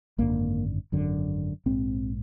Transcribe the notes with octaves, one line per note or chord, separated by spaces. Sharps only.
G#1 F#2 D3 A#3
G#1 F#2 D3
A#1 G#2 C4